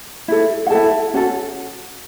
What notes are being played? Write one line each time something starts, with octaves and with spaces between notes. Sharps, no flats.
E4 A4
F#5
E4 A4 A5
C#4 F#4 A4